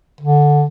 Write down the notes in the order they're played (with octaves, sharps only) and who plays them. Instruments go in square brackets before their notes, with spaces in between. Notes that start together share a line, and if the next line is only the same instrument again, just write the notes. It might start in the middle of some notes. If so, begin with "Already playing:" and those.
[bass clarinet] D3